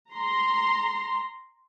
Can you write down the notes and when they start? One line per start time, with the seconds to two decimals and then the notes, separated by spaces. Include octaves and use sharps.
0.11 A#5 C6